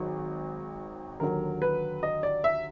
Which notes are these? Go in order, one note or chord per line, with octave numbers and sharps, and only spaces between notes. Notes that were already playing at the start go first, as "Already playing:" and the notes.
Already playing: G#1 D#3 F#3
D#2 D3 F#3 A#4
B4
D#5
D5
E5